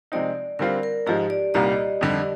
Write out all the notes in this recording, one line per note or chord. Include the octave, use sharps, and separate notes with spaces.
C3 F3 G#3 C4 D#4 D5
D3 G3 C4 F4 A#4
A#4
G#2 F3 G#3 G4
D5
C2 A#2 G3 A#3 D#4 D#5
F2 D3 G3